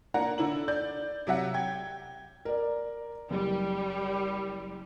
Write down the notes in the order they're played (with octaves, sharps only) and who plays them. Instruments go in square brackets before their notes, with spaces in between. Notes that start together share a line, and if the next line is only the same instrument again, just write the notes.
[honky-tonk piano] A#3 D4 A#4 F#5 A#5
D3 D4 E4 F#7
D5 G6
C3 F#3 E5 F#5
G5 G#6
[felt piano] A#4 D5
[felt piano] F#1 [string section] G3